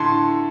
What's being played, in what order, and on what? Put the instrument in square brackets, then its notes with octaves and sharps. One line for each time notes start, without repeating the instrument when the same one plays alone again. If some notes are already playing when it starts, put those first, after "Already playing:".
Already playing: [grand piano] A2 D3 A5 C6